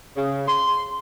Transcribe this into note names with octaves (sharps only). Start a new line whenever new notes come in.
C#3
C6